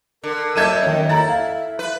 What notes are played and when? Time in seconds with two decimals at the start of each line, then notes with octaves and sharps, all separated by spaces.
0.24 D3 A#4
0.56 F#2 A4 D#5 E5 G6 G#6 D#7
0.83 D#3 C#4
1.09 E4 A#5 A6
1.29 E5 F5
1.79 B4